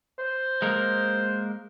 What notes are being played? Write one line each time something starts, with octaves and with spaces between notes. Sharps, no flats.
C5
G#3 A#3 A#4